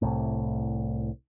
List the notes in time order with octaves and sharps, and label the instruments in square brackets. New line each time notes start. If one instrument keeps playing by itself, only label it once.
[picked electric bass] C2 A2